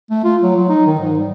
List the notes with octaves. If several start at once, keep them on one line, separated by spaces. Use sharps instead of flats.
A3
F4
F#3
F#3
D#4
D#3
G#2
G3